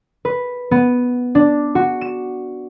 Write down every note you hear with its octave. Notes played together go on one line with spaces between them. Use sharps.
B4
B3
D4
F#4
E7